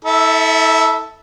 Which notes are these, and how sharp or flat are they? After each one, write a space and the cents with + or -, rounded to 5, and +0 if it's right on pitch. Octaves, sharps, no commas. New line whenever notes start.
E4 -40 A4 +0 E5 +0